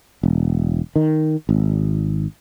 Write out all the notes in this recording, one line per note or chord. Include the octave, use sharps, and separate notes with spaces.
E1
D#3
G#1